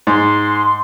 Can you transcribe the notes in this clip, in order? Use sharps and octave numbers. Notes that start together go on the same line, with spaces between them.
G#2 C6